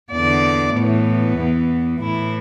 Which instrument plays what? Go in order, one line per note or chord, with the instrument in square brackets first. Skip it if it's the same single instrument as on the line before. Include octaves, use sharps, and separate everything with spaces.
[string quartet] E2 D3 D5
A2 E3 B3
E2 E3
A2 E3 E4